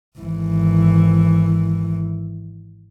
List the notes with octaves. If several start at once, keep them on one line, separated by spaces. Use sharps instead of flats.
G#1 E3